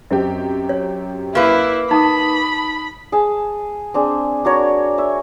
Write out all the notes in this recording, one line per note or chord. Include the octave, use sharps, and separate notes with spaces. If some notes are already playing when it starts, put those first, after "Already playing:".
F#2 C4 G4 D#5
C#5
A#3 E4 B4 F5
D#4 A5 B5 D#6
G#4 A5
C4 D4 G#4
D4 F#4 A#4 C#5
C#5 E5